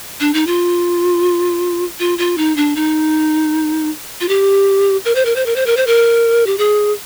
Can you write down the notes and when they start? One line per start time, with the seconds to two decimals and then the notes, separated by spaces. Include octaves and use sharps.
0.20 D4
0.34 D#4
0.47 F4
1.99 F4
2.18 F4
2.38 D#4
2.57 D4
2.76 D#4
4.21 F4
4.28 G4
5.05 A#4
5.15 C5
5.25 A#4
5.36 C5
5.46 A#4
5.56 C5
5.66 A#4
5.77 C5
5.87 A#4
6.46 G4
6.58 G#4